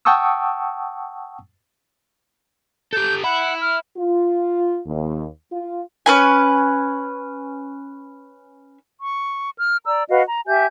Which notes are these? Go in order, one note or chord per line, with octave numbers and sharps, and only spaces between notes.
F#5 G5 A5 C#6 D#6 E6
G4 A4 G6
E5 F#5 B5
F6
F4
D#2
F4
C#4 B4 G#5
C#6
F6
D5 A#5 E6
F#4 B4 D#5 F5
A#5
G4 E5 G#5 G6